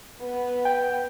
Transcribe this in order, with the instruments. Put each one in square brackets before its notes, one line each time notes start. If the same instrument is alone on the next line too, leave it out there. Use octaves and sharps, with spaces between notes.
[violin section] B3
[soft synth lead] G5